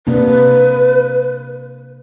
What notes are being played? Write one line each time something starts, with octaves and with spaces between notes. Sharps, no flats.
C3 A#3 D4 B4